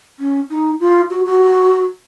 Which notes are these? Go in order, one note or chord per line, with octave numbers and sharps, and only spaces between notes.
C#4
D#4
F4
F#4
F#4